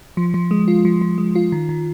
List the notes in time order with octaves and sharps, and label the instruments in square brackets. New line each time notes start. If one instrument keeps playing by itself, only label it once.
[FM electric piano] F3
F3
G#3
F4
F3
F3
G#3
F4
D#3
D#3